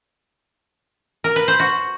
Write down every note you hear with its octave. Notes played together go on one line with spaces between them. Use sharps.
A#4
B4
C5
F#4